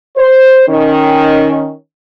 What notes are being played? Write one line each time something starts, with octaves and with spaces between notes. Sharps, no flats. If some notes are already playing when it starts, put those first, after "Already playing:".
C5
D#3 C#4